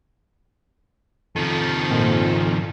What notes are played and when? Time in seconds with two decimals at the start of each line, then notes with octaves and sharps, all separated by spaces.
1.36 F2 D#3 F3 A4
1.90 G#1 A#2